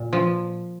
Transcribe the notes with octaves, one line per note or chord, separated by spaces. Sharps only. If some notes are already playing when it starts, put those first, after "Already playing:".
Already playing: A#2
F3